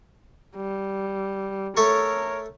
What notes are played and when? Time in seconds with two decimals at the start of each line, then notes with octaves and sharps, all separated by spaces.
0.56 G3
1.77 A3 A4 A#4 C#5 C#6